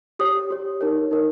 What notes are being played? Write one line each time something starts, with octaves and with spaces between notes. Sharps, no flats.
G4 C#5 D#6
G4 C#5
D#4 A#4 C#5
D#4 A#4 C#5